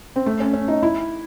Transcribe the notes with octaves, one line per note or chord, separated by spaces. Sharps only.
C4
A3
C#4
C#4
D#4
E4